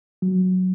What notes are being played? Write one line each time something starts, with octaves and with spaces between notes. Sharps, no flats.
F#3